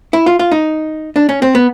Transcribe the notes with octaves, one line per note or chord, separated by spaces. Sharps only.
E4
F4
F4
D#4
D4
C#4
C4
B3